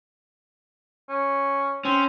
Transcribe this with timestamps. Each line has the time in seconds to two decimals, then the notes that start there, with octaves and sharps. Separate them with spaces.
1.10 C#4
1.85 C4 C#4